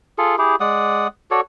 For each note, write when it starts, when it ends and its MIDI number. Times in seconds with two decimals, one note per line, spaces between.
0.18 0.36 65
0.18 0.36 68
0.18 0.36 69
0.38 0.56 64
0.38 0.56 67
0.38 0.56 68
0.60 1.07 56
0.60 1.07 74
0.60 1.07 78
0.60 1.07 87
1.31 1.41 66
1.31 1.41 69
1.31 1.41 73
1.31 1.41 74